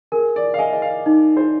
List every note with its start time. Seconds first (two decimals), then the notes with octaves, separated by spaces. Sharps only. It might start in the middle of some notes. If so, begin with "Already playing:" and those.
0.12 G#4 A#4
0.36 D5
0.54 F5
0.59 D#5 G#5
0.72 D#5
0.82 F5
1.06 D#4
1.37 C5